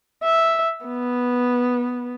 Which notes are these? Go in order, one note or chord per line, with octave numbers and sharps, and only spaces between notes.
E5
B3